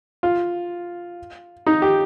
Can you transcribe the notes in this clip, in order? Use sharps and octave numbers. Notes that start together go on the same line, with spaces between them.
F4
D#4
G4